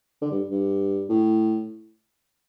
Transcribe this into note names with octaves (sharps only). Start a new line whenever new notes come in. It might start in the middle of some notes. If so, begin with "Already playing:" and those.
D3
G2
G2
A2